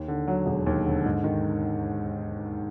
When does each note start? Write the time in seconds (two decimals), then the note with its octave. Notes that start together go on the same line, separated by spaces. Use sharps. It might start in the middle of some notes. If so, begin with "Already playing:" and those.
Already playing: D#2
0.08 D3
0.27 F#3
0.46 E1
0.66 D#2
0.85 D3
1.05 G#2
1.24 D#3